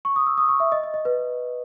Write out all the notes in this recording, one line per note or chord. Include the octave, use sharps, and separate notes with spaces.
C#6
D#6
E6
D#6
C#6
E5
D#5
D#5
D#5
B4